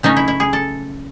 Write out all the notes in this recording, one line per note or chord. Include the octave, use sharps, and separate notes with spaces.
C#3 F#3 A3 C#4 D#4
E4
E4
G#4
A4